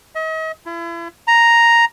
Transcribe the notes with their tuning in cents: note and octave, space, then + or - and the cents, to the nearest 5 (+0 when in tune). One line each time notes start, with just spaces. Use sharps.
D#5 +40
E4 +40
A#5 +0